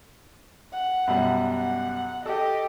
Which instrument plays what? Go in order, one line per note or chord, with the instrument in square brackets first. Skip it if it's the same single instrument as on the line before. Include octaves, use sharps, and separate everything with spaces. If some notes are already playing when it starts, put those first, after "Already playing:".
[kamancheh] F#5
[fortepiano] F#2 B2 G3
[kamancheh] F#5
[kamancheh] G4 D#5 [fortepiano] A4